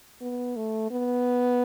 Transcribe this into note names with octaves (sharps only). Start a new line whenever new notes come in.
B3
A3
B3